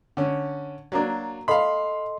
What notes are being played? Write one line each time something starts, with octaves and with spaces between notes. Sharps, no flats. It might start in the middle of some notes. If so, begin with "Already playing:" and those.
D3 C#4
F#3 A#3 D4
A4 D#5 F5 B5 C6